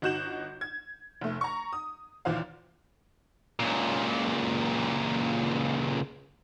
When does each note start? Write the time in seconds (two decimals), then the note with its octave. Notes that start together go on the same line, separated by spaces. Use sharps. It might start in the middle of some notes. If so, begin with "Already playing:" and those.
0.02 G1 D#4 F#4 G6 E7 F#7
0.61 G#6
1.21 F1 A3
1.41 A#5 C#6
1.73 D#6
2.25 D#2 A#2 E3 C5 F5
3.59 C#2 A#2